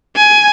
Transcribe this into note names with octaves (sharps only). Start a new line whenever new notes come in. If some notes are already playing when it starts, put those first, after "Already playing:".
G#5